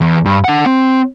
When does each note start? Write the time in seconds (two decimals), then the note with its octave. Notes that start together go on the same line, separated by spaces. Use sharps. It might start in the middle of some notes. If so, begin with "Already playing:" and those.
0.01 E2
0.26 G2
0.44 D4 F#5
0.66 C4